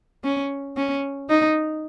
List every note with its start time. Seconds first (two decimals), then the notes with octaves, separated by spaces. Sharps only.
0.24 C#4
0.77 C#4
1.29 D#4